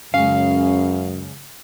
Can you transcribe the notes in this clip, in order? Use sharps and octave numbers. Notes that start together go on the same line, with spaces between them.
C#2 F#2 C#3 C#4 F5